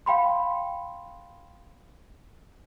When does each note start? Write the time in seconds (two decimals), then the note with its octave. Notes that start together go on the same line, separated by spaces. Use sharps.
0.06 F5 G5 B5 C6